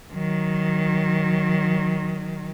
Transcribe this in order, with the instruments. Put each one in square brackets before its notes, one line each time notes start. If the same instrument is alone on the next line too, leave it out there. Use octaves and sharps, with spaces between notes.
[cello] D#3 F#3